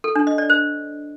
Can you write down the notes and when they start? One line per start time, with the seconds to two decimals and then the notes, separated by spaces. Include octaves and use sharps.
0.04 A4
0.15 D4
0.27 D#5
0.38 D5
0.50 C5